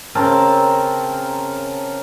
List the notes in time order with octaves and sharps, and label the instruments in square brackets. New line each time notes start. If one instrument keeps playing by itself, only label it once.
[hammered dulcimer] C#3 C4 A#4 A5